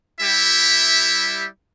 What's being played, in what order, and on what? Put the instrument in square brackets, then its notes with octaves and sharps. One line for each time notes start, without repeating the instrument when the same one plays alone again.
[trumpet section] G3 E4 G4 E5